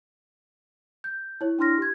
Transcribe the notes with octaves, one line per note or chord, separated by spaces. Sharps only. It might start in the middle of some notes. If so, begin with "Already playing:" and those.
G6
E4 C#5
D4 E4 C6 F6 A#6
G4 G#6